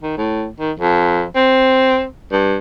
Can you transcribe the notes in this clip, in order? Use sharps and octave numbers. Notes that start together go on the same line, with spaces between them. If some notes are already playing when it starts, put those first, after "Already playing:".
D#3
A2
D#3
F2
C4
G2